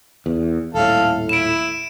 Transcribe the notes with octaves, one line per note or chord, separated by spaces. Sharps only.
E2
D#1 A2 A4 F5
E4 D7 E7